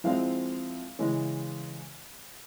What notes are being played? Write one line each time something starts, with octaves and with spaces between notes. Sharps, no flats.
F3 G#3 C4 E4 F5
C#3 E3 G#3